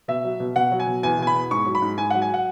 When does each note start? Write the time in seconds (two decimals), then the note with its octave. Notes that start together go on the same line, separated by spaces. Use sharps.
0.08 B2 E5
0.24 F#3
0.40 B2
0.56 B2 F#5
0.72 F#3
0.80 G#5
0.87 B2
1.03 E2 G#5
1.19 B2 G#5
1.27 B5
1.35 B3
1.51 G#2 C#6
1.67 F#3
1.75 B5
1.82 G#2
1.98 G#2 G#5
2.10 F#5
2.14 F#3
2.22 G#5
2.34 F#5